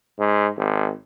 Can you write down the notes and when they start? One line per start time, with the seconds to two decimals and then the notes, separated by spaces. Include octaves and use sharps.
0.19 G#2
0.56 G#1